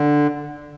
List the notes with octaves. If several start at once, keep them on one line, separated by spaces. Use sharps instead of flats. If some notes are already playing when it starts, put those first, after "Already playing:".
Already playing: D3